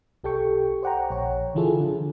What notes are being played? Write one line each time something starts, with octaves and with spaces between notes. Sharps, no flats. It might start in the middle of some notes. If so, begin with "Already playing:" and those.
B1 G4 A4 G5 C#6
C5 D5 F#5 G5 A#5
A#1 C#5
D3 E3 E4 F4 G#4 A4
D3 F3